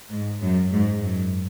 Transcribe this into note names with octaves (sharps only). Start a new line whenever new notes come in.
G#2
F#2
G#2
F#2